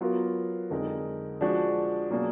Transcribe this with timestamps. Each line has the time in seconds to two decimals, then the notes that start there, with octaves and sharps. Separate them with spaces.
0.01 F#3 B3 F4 A#4
0.70 F2 D3 G#3 D#4 A#4
1.41 F3 G#3 D4 F#4
2.11 B2 F#3 A#3 D4 G#4